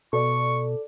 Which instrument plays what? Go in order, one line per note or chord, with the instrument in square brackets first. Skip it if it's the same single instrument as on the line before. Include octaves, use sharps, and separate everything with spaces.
[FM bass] B2 [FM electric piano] A4 D5 [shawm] C#6